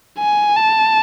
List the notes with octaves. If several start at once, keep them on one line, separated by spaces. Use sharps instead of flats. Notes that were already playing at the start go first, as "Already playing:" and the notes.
G#5
A5